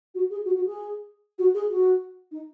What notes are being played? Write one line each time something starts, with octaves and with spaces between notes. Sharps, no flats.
F#4
G#4
F#4
F#4
G#4
F#4
G#4
F#4
D#4